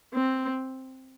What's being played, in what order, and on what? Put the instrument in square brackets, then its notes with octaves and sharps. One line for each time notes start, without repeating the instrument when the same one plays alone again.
[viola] C4